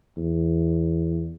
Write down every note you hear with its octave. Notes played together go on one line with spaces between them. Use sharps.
E2